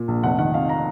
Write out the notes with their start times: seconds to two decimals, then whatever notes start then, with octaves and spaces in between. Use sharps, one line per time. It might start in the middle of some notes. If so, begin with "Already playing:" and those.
Already playing: A#2
0.08 A#1
0.23 F1 F#5
0.39 D#3 F#5
0.54 F2 F5
0.69 A#5